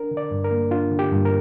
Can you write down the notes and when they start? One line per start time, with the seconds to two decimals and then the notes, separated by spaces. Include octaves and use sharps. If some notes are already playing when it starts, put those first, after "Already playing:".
Already playing: D4 A#4
0.11 D3
0.17 D5
0.31 G2
0.44 A#4
0.51 A#3
0.71 D4 F4
0.92 D3
0.99 G4
1.12 G2
1.25 A#4